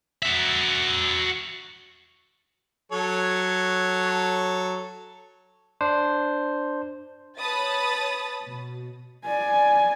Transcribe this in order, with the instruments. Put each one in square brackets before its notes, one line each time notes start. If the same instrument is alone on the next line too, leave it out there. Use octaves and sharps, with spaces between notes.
[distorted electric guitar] F#4 E5
[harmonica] F#3 A4 C#5
[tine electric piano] D4 C5
[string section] B4 C#5 A5 B5 D#6 A6
B2
[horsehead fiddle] D5 G#5